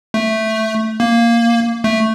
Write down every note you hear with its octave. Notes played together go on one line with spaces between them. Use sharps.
A3
A#3
A3